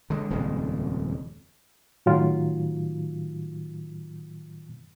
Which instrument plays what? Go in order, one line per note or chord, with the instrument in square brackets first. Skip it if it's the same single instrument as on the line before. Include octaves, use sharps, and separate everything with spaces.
[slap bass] D3 G#3
D#1 F2 C#3 G#3
[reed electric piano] A2 D#3 F#3 F4